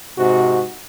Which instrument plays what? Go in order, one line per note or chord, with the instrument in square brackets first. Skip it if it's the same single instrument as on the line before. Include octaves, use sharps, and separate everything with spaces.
[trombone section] G#2 C3 F#4